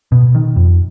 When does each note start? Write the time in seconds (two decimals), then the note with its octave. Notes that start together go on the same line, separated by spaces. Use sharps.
0.12 B2
0.35 D#3
0.56 F2